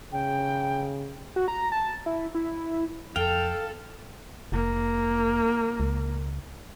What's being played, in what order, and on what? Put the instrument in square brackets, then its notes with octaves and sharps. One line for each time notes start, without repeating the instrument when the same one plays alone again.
[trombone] C#3 [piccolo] G5
[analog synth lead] F#4
A#5
A5
E4
E4
[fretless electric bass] F2 [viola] A4 [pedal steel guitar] F5 [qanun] G5
[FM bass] F1 [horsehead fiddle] A#3
[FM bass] C#2